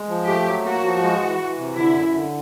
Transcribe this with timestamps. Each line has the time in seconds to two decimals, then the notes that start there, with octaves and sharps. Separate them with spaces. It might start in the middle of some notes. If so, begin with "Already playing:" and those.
Already playing: G#3
0.08 F3
0.27 A3 G4
0.46 F#3
0.64 A#3 F#4
0.83 F3
1.01 G#3
1.20 E3
1.38 E3
1.58 C3
1.75 D3 E4
1.94 F#2
2.13 D3